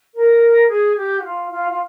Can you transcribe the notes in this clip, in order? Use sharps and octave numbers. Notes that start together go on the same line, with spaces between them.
A#4
G#4
G4
F#4
F4
F4
F4